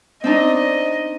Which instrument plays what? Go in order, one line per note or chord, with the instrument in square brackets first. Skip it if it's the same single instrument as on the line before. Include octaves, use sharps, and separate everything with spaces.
[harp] C4 D4 D#4 [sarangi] D#5